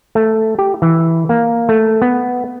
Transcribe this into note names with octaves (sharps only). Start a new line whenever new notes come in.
A3
G4
E3
A#3
A3
B3